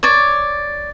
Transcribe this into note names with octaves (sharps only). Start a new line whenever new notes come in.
C#5 D5